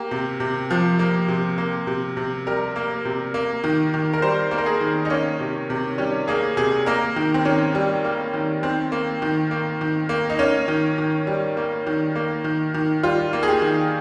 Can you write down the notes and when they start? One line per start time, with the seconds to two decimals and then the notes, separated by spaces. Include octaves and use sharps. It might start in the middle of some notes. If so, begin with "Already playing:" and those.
Already playing: A#3 G4
0.11 C3
0.40 C3
0.70 F3
0.99 A#3
1.28 C3
1.58 A#3
1.87 C3
2.17 C3
2.46 G3 A#4
2.76 A#3
3.05 C3
3.34 A#3
3.64 D#3
3.94 D#3
4.14 A#4
4.22 G3 C5
4.51 A#3
4.58 A#4
4.66 G#4
4.81 D#3
5.05 D#4
5.10 A#3 C#4
5.40 C3
5.70 C3
5.98 G3 C#4
6.28 A#3 G#4
6.57 C3 G#4
6.86 A#3 A#4
7.16 D#3
7.34 C4
7.45 D#3 C#4
7.75 G3
8.05 A#3
8.33 D#3
8.63 D#3 C4
8.92 A#3
9.22 D#3
9.51 A#3
9.81 D#3
10.09 A#3
10.30 D#4
10.39 A#3 C#4
10.68 D#3
10.98 D#3
11.27 G3
11.57 A#3
11.87 D#3
12.15 A#3
12.44 D#3
12.74 D#3
13.03 G3 F4
13.33 A#3
13.43 G#4
13.48 G4
13.62 D#3